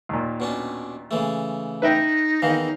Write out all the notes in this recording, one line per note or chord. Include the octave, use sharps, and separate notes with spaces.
D#2 A#2
B2 C#4 D4
C#3 E3 A3
D#4 B4 E5 G5
E2 D#3 E3 F5